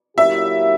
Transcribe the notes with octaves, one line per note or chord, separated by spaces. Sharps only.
A#2 F#3 A#3 E4 G4 E5